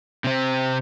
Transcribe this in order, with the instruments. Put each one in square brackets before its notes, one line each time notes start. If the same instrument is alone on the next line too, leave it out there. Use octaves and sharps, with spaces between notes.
[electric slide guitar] C3 C4